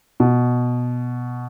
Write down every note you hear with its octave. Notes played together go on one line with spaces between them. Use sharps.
B2